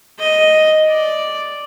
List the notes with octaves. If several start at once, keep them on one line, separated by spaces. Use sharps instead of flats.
D#5
D5